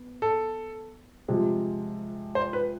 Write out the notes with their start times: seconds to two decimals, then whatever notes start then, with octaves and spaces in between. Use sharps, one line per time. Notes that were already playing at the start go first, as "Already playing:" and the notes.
Already playing: B3
0.22 A4
1.28 C3 F3 G#3
2.35 C5
2.53 B4